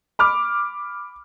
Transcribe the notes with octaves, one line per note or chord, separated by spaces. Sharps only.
B5 D6 F6